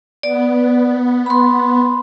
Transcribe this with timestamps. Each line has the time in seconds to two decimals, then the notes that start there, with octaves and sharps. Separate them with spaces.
0.23 B3 D5
1.26 B5 C6